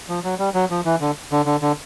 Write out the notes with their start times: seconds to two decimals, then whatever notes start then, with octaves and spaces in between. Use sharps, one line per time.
0.09 F3
0.24 F#3
0.39 G3
0.54 F#3
0.70 F3
0.85 E3
1.01 D3
1.32 D3
1.46 D3
1.62 D3